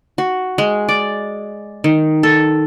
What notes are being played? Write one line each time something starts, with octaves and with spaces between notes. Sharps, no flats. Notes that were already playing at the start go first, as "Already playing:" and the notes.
F#4
G#3
D5
D#3
A4